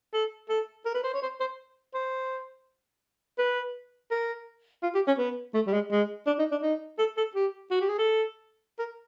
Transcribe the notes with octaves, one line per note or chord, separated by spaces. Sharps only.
A4
A4
A#4
B4
C5
C#5
C5
C5
C5
B4
A#4
F4
G4
C#4
B3
A3
G3
G#3
G#3
D4
D#4
D4
D#4
A4
A4
G4
F#4
G4
G#4
A4
A#4